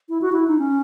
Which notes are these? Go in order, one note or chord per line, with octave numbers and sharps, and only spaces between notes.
E4
F#4
E4
D#4
C#4